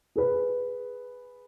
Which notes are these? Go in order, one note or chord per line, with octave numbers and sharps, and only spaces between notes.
G#4 B4